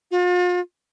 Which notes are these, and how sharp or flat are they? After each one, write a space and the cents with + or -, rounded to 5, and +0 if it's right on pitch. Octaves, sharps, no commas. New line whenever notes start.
F4 +40